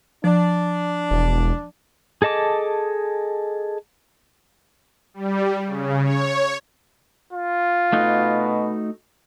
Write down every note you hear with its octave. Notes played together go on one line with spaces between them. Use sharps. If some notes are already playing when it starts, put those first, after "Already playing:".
F3 D4
E1
G#4 A4 D#5 A5 D6
G3
C#3
C#5
F4
B2 A3 D#4 F#4